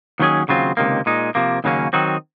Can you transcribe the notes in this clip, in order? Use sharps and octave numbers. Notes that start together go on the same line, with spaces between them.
D#2 D#3 F#3 C#4 G#4
D#2 C#3 F#3 C4 F4
C#2 C3 D#3 A#3
A#2 G#3 D#4
C3 F3 A#3
D#2 C#3 F#3 A#3 C#4
D#3 F#3 C4 D#4 F#4